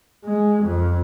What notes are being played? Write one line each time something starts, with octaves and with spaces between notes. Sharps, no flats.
G#3
F2